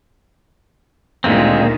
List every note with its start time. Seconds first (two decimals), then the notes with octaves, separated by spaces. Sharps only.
1.24 D2 A#2 D#3 G#3 A#3 C4